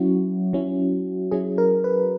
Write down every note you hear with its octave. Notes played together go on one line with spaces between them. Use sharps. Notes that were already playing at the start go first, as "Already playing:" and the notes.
Already playing: F#3 C#4 E4 F#4
F#3 C#4 E4
F#3 C#4 E4 G#4
A#4
B4